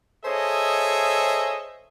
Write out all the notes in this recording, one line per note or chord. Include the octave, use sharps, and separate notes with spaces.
G#4 A4 C5 C#5 D#5 E5